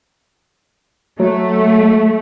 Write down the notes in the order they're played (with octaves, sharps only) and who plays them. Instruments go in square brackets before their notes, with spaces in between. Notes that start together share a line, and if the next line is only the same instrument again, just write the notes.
[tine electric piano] F#3 [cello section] A3